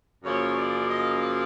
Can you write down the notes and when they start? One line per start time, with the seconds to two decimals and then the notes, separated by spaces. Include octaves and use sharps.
0.24 F#2 C#3 F3 A#3 C#5
0.55 D5
0.87 D#5